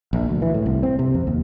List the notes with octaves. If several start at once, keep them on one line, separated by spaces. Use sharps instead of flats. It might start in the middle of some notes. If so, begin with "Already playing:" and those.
A#1
D2
E3
A2
C2
C4
C3
F2
D#2